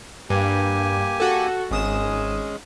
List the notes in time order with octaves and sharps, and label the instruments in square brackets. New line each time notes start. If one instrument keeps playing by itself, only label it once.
[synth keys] G2 [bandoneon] A#3 G4 G#5
[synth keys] F#4 A4
[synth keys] G#1 D#6 E7 [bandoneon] G#3 C#4 G#4